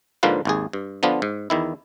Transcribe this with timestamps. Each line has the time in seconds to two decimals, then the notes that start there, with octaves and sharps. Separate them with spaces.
0.23 G#2 D3 F3 A#3 F4 B4
0.45 G#1 D#2 G#4
0.73 G2
1.03 D3 F3 B3 D4 F4
1.22 G#2
1.50 E2 D#3 E4